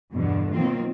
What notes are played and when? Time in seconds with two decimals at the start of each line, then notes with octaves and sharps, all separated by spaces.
0.13 E2 G2 B2 D3
0.53 B2 D#3 F#3 A#3 C4 F4